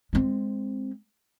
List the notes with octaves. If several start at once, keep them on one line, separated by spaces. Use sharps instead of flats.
G#3 C4